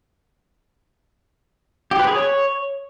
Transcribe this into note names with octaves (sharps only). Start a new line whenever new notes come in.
G4
B4
G#4
C#5